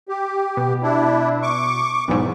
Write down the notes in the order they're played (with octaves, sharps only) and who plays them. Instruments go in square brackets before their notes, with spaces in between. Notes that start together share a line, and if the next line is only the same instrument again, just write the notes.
[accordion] G4
[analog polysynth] B2
[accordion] D4 E4
C#6 D6
[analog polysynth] B1 E2 G#2